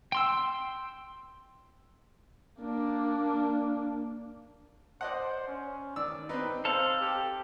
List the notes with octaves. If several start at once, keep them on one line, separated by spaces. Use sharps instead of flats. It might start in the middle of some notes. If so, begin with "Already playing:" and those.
G5 C6 E6
A#3 D4
C5 D5 D#5 F#5
C#4
D#3 D5 E6
C4 D#4 B4
A4 C5 F5
G4